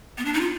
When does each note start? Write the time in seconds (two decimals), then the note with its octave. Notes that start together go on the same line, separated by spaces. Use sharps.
0.18 B3
0.25 D4
0.34 D#4
0.41 F4